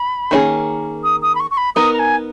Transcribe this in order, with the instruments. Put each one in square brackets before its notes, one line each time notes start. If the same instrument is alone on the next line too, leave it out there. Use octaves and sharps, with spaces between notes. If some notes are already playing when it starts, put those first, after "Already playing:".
Already playing: [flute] B5
[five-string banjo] D#3 A#3 C#4 E4 G#4
[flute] D#6
D#6
B5
C#6
C#6
B5
[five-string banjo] B3 D#4 A#4 [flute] D#6
[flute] A#5
G#5